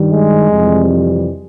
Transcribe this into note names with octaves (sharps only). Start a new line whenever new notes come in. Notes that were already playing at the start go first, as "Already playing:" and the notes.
Already playing: G2 D#3 G3
G#3
F2 C3 E3 G3